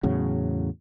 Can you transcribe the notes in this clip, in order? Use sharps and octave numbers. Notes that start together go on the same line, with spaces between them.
E2 A2 C#3 F#3